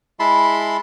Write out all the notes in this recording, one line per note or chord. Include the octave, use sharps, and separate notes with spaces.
G#3 E4 A5 B5 C6